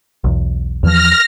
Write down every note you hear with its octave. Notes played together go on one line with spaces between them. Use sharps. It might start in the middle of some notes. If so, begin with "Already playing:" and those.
B1 E2
E2 E3 F3 F6 A#6